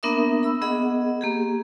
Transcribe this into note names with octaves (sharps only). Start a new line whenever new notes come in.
A#3 B3 D4 A#4 E5 D#6
B5 E6
B3 G#4 D#5 F#5
A#3 G4 G#4